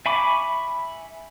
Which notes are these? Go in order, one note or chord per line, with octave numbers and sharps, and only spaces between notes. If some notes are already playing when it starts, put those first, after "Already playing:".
E5 G#5 B5 C#6 D6